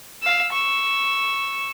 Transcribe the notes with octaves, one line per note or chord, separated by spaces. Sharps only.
F5 E6
C#6 E6